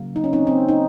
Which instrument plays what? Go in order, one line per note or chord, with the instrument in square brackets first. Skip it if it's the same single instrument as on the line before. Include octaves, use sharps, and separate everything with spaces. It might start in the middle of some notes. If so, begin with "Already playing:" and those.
Already playing: [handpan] C#3 F#3 A#3
D#4
C#4
C4 D#4
C4
D#4